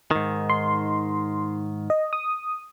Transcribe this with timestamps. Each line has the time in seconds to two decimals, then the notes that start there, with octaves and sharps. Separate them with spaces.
0.11 G#2 D#3
0.50 C6
1.90 D#5
2.13 D#6